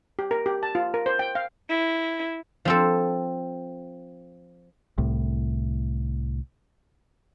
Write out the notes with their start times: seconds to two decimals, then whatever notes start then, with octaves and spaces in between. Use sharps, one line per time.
0.19 G4
0.31 A#4
0.46 G4
0.63 A5
0.75 F4
0.94 A#4
1.06 C5
1.19 G5
1.35 F5
1.69 E4
2.65 F3 C4 A4
4.98 C2 A2